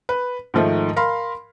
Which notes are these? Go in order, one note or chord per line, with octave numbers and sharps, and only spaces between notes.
B4
G#2 D#3 F3 A3
A#4 F5 B5 C6